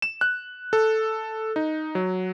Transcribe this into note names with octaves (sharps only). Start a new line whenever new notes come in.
E7
F#6
A4
D#4
F#3